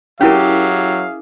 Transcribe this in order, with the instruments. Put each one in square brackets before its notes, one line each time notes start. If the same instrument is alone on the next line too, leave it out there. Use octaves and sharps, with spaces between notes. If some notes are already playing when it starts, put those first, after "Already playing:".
[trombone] F#3 [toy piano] C#4 E4 A#4 [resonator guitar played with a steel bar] G4 [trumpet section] G#4 E5 F5